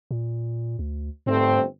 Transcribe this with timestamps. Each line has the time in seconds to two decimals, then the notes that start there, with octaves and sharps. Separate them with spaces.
0.11 A#2
0.79 D2
1.26 G1 G#2 A3 C4